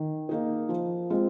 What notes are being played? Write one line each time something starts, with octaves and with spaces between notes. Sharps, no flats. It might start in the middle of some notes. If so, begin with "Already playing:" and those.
Already playing: D#3
A#3 D#4 G#4
F3
G#3 C4 F4